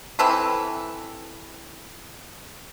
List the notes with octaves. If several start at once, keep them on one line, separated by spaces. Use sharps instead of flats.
E3 C4 A4 B4